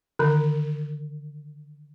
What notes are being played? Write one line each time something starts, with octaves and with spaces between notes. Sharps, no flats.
D3 D#3